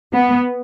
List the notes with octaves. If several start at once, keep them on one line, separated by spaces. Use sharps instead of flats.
B3